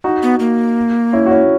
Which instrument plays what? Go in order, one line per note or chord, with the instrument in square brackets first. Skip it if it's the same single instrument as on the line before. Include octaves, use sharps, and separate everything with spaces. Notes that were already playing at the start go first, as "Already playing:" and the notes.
[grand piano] D#4 F#4
[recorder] B3
A#3
[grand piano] C#4 E4
F#4
C#4 E4